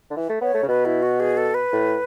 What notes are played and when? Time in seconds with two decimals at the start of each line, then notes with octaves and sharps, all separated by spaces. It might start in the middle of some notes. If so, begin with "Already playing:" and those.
0.10 D3
0.16 E3
0.29 A3
0.41 B3 C#5
0.54 A3
0.63 C#3
0.68 B2 B4
0.85 E4
1.02 F#4
1.20 G#4
1.37 A4
1.54 B4
1.72 A2